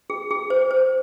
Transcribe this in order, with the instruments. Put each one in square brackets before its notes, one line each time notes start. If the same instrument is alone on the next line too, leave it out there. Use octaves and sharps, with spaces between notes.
[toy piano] G#4
G#4
C5
C5